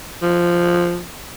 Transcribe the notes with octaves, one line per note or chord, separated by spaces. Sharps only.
F3